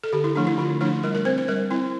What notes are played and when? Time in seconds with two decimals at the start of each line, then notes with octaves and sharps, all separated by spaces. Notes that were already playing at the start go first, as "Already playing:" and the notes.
0.04 A4
0.13 D3 G4
0.24 E4
0.36 F3 A3 D4
0.47 E4
0.58 D3 F4
0.81 F3 A3 D4 E4
1.04 G3 A#4
1.15 A#4
1.25 C4 C5
1.38 C5
1.48 G3 A#4
1.71 C4 E4